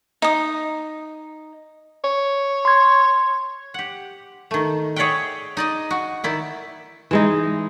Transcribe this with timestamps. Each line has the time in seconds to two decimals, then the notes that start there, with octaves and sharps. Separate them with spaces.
0.22 D#4 D#6
2.04 C#5
2.65 C6 G#6
3.74 G4 F#5
4.51 D#3 A3
4.96 G#4 C#5 D5 E5 F#5 G5
5.57 D#4 D5 D#5
5.91 F#4
6.24 D#3 E4 D5
7.11 E3 G#3 D#4